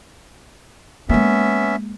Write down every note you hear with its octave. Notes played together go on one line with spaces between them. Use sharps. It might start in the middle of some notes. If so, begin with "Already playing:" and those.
G#3 A#3 B3 C#4 E5